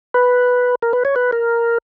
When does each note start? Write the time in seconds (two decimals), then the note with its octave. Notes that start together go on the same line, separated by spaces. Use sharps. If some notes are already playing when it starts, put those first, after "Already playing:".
0.14 B4
0.82 A#4
0.93 B4
1.05 C#5
1.16 B4
1.32 A#4